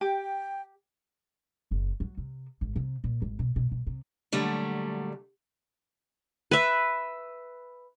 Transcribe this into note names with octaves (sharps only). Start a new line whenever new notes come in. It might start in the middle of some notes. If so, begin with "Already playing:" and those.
G4 G5
F#1
F#3
C3
G#1
C3
A#2
G#1
B2
B2
B2
C3
A#2 D3 F#3 G3 A3
B4 E5